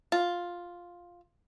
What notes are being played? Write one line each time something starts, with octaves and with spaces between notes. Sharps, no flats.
F4